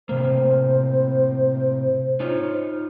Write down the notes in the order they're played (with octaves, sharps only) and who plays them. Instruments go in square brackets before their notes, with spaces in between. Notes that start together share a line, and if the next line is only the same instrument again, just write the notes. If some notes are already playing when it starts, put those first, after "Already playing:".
[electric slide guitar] A2 C3 A#3 [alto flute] C5
[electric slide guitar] D#4 F4 C#5